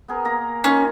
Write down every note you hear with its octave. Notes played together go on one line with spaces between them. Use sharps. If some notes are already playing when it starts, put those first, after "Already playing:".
B3 G#4 A#4
A#3 A#4 A#5
D#3 C#4 F4